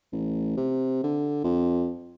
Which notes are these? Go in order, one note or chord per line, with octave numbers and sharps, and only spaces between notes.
A1
C3
D3
F2